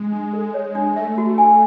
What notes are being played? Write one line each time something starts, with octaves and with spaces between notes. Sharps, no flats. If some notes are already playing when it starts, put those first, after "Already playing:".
Already playing: G#3
D4
A4
C#5
D4
A3 E5
F#4
G#5